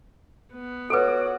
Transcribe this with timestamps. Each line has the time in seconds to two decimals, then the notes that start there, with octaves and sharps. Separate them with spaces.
0.53 B3
0.90 F#4 A4 B4 C#5 D6 D#6